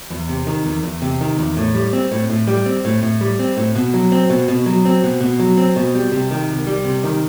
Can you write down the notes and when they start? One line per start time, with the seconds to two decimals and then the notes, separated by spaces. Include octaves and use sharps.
0.10 E2
0.29 C3
0.47 D#3
0.65 E2
0.83 E2
1.02 C3
1.21 D#3
1.38 E2
1.57 A2
1.75 G3
1.93 C4
2.12 A2
2.30 A2
2.47 G3
2.66 C4
2.85 A2
3.03 A2
3.21 G3
3.39 C4
3.57 A2
3.75 B2
3.94 F#3
4.12 C4
4.30 B2
4.48 B2
4.66 F#3
4.85 C4
5.04 B2
5.21 B2
5.40 F#3
5.58 C4
5.76 B2
5.94 G3
6.12 C3
6.31 D#3
6.49 C2
6.67 G3
6.85 C3
7.04 D#3